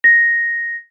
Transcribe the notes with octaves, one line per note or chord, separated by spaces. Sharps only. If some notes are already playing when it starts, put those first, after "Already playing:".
A#6